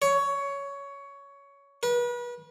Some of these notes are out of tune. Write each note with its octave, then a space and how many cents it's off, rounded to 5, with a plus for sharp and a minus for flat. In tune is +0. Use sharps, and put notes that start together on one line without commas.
C#5 +15
B4 -35